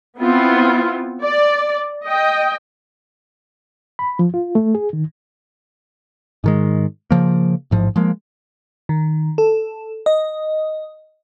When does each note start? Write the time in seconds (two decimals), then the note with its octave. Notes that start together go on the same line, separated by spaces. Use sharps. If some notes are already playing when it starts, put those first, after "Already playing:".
0.18 B3 C4 E4 F4
1.23 D5
2.05 D#5 G5
3.99 B5
4.19 F3
4.34 F4
4.55 A3
4.75 G#4
4.93 D#3
6.44 G#2 D#3 G#3
7.11 C#3 F3 A#3
7.71 A1 G#2 F3
7.96 F3 G#3 A#3
8.89 D#3
9.38 A4
10.06 D#5